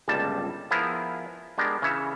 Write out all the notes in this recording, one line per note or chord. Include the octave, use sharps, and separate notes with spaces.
G1 C#2 A#2 G3 A5
F3 B3 E4 G#4 A#4
G#3 B3 D4 G4 A#4
C#3 E3 C#5 E5